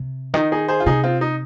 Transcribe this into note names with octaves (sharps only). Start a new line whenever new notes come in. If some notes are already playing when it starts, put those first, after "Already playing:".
Already playing: C3
D#3 D#4
D#4 G#4
G#4 C5
F4
C3 D#4 G#4
C4 F4
D#4